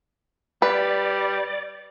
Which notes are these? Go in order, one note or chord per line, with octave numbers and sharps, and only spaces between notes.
G3 B4 D5